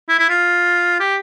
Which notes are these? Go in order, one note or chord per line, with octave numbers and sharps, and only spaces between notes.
E4
E4
F4
G4